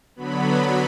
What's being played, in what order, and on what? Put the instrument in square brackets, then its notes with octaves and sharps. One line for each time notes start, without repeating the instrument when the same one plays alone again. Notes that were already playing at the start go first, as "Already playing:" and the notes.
[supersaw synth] D3 F#3 B3 B5